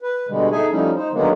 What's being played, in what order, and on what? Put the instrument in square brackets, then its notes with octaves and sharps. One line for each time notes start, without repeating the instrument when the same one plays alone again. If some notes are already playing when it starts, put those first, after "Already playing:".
[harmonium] B4
B2 D3 G3 G#3
D#4 G#4 A4 E5 G#5
F3 G3 A3 C#4 D#4 E4
D#4 C5
D3 D#3 F#3 G#3 A#3 B3